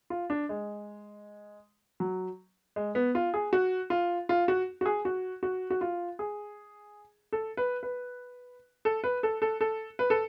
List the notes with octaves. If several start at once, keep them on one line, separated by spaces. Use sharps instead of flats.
F4
D4
G#3
F#3
G#3
B3
F4
G#4
F#4
F4
F4
F#4
F#4
G#4
F#4
F#4
F#4
F4
G#4
A4
B4
B4
A4
B4
A4
A4
A4
B4
A4